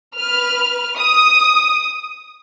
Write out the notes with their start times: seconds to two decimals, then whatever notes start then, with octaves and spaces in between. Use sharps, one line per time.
0.16 B4 F6
0.98 D#6